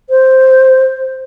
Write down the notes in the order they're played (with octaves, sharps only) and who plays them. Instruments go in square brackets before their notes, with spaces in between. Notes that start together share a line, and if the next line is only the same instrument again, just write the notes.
[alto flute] C5